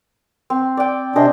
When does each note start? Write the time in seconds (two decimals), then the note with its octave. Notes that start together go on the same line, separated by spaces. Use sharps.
0.50 C4
0.77 D5 G5
1.16 C3 D4 C5 D#5 G#5